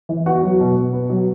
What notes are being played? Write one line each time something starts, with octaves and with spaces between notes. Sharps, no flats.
E3
B3 F#4 F#5
F#3
B2
B2
B3
F#3